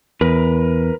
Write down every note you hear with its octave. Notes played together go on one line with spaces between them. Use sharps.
E2 A#4 B4